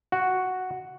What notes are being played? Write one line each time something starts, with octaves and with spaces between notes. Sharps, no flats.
F#4